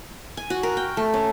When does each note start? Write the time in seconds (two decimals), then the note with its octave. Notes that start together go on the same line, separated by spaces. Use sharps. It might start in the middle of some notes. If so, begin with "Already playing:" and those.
0.37 G#5
0.50 F#4
0.63 A#4
0.77 G5
0.97 A3
1.14 C#4